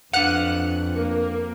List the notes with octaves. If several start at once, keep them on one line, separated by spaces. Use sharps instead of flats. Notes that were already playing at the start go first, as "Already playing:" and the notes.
F2 D4 B4 F5 F#5 F#6
A#3